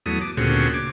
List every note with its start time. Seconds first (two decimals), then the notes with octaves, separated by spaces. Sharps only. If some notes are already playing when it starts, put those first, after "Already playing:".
0.06 E2 F#3 A3 D#6
0.22 D6
0.37 D2 A#2 C#3 C4 F#4 G#4
0.74 D6